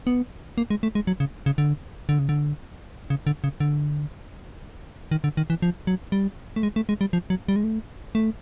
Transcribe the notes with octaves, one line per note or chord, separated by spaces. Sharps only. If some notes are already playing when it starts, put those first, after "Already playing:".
B3
A#3
G#3
A3
G#3
F#3
C#3
C#3
D3
D3
C#3
D3
C#3
D3
C#3
D3
D#3
D3
D#3
E3
F3
F#3
G3
A3
G#3
A3
G#3
G3
F3
F#3
G3
G#3
A3
A3